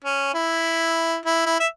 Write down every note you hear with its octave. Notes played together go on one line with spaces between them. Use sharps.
C#4
E4
E4
E4
E5